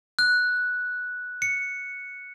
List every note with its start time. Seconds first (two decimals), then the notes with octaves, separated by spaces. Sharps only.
0.19 F#6
1.42 C#7